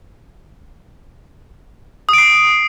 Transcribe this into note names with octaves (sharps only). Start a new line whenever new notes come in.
D#6 C7 D7